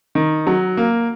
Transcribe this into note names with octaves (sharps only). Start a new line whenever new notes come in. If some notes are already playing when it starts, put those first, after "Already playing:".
D#3
F#3
A#3